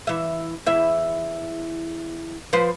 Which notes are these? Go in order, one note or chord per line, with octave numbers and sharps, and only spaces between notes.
E3 E5
E2 E4 E5
F3 B4 C5